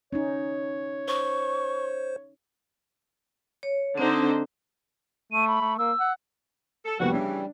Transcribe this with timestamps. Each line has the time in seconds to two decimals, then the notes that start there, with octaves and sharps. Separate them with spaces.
0.13 C#4 D#4 C#5
1.08 C5 C#6
3.63 C#5
3.98 D3 C4 D4 D#4 C5
5.32 A3 D#7
5.48 B5
5.61 A3
5.78 A#3 E6
6.00 F#5
6.85 A4
7.00 F1 D3 G3 A#3 B3 F#4
7.13 C#3 E3 D4